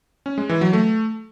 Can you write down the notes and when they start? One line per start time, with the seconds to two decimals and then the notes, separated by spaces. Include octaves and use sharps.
0.26 C#4
0.38 G#3
0.49 E3
0.61 F#3
0.73 A3